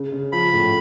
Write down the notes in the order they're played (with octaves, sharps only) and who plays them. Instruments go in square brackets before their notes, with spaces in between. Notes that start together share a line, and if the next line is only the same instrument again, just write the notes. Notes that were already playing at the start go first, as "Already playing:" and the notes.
Already playing: [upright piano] C#3
C#3
[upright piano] F3 [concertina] B5
[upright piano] A2